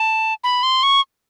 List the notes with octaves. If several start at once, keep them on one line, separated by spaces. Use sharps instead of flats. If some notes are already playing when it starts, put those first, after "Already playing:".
Already playing: A5
B5
C6
C#6